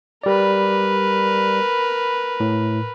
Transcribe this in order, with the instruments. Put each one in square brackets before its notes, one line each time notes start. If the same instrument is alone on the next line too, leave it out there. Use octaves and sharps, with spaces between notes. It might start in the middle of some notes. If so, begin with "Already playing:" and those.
[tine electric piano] G3 D5 [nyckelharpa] A#4 B4
[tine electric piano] A2